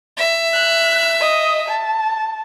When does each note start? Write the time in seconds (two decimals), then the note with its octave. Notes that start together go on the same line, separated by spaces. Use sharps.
0.17 E5
0.54 F#6
1.20 D#5
1.68 A5